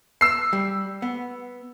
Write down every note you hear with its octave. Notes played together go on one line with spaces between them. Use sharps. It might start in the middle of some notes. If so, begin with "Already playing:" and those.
E6 C7
G3
B3